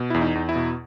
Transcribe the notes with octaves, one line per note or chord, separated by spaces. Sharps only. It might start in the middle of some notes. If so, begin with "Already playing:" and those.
Already playing: B2
E2 E4
D#4
E2
E4
B2